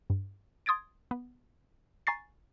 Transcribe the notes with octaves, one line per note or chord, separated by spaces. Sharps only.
G2
C6 D#6 G#6 A6 D7
B3
G#5 A#5 C#6 A6 C7